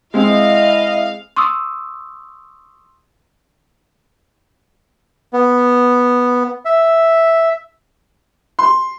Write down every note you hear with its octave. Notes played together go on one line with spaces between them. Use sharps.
G#3 C4 E4 D#5 F5
C6 C#6 D#6 E6
B3
E5
C6